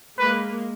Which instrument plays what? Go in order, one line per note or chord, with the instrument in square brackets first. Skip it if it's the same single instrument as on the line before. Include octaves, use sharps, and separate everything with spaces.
[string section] G#3 A#3 [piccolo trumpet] B4